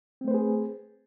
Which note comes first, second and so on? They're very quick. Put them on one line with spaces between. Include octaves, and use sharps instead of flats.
C4 A3 C5 B4 G#4